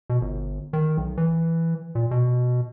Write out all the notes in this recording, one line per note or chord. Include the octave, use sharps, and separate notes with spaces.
B2
G1
D#3
B1
E3
A#2
B2